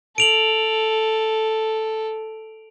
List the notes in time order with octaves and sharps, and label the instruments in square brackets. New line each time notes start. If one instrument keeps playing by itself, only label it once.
[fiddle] A4 [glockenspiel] D7 F7 F#7